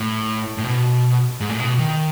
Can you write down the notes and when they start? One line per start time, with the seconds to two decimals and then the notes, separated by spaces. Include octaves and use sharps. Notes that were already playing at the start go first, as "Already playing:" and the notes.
Already playing: A2
0.58 A2
0.64 B2
1.40 G#2
1.50 A2
1.59 B2
1.78 D#3